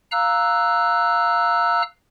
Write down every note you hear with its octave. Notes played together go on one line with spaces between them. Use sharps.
F5 A#5 E6 F#6